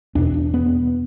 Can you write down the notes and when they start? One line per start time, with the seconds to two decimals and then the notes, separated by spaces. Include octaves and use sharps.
0.15 E2 B2 D4
0.34 D4
0.54 B3